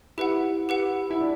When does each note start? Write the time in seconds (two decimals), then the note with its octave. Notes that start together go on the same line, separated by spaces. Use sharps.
0.18 E4 G4 B4 F#5
0.69 G4 B4 F#5
1.10 E4
1.20 D4